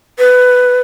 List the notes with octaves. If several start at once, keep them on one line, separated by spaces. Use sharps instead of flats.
B4